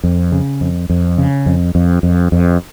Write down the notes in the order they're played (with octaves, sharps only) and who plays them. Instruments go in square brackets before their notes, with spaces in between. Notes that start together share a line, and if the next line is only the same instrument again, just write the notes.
[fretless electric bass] F2
C#3
F2
F2
C#3
F2
F2
F2
F2